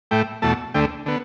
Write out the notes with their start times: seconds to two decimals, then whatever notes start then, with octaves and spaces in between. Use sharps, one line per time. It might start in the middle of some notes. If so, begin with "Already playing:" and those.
0.11 A2 A3 G5
0.42 E2 B2 A3 A5
0.74 D2 D3 A3 G5
1.06 D3 B3